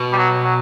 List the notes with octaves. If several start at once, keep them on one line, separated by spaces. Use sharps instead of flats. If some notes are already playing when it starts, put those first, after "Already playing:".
Already playing: B2
G3
F#3
F#3